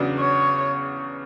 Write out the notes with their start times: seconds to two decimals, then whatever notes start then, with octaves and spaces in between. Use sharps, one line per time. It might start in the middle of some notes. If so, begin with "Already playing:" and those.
Already playing: E2 C#3 F#3 B3 D4
0.19 C#5